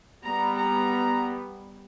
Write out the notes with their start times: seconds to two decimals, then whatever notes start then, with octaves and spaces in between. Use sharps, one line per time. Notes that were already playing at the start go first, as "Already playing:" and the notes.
0.23 G3 B3 A#5
0.57 A#5